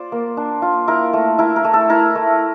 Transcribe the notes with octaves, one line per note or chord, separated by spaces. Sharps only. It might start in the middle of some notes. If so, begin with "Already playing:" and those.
Already playing: F4 C5 D5
A#3
D4
F4
E4 A#4
A3
E4 A#4
A#4
A3
A4
E4 A#4
A3